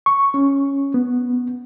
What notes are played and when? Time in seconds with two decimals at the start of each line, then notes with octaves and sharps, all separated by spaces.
0.06 C#6
0.34 C#4
0.94 B3